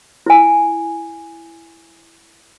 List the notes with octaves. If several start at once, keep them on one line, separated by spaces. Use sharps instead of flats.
E4 G#5